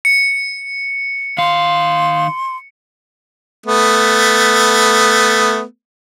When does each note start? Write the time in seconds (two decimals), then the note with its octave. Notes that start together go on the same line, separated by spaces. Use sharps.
0.05 C#7
1.38 D#3 F5 C6
3.66 A3 B3